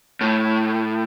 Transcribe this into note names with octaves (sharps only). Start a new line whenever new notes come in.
A2